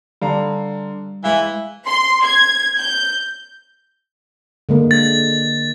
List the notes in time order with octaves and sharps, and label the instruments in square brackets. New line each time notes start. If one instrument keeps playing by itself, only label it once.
[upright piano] D3 F5 A#5 [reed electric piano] G3
[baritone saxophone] E3 [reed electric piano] G#3 F5 [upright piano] E5 F#7
[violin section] C6
G#6
G6
[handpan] D3 G#3 A#3
[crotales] A6